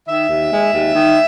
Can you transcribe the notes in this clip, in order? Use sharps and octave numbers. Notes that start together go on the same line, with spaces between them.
D#3 E5
D#2
G#3
D#2
D#3